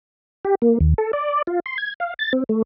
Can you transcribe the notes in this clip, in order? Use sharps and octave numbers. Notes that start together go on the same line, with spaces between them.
G4
A#3
D#2
A4
D5
F4
C6
G#6
F5
A6
C4
A3